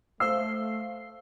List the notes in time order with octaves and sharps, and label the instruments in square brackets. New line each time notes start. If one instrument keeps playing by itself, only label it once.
[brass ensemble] A3 [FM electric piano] C5 F5 C7 [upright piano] E6